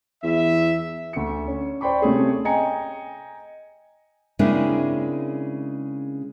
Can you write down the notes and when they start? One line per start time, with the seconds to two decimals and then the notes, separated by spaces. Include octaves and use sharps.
0.24 E2 E5
1.13 D2 C#7
1.48 C#4
1.81 C5 D5 G5 B5 C#6
2.02 C3 A3 C#4 G#4
2.45 D#5 G5 G#5 A#5 C#7
4.39 C#3 G#3 A#3 C4 D4 E4